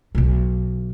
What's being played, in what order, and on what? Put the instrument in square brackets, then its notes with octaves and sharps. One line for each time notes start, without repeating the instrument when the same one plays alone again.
[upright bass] B1 B2